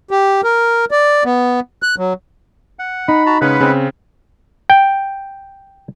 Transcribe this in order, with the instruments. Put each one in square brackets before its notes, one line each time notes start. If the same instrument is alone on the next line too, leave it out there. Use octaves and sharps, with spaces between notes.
[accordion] G4
A#4
D5
B3
F#6
F#3
[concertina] F#5
[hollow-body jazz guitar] D#4 [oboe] B5
[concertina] F#4 A5 A#5
[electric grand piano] C#3 C#4 [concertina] G#3 F#5 B5 [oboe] B4
[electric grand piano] C#3 C4
[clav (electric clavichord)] G5